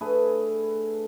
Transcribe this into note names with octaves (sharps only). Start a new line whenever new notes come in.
A3 D4 G#4 B4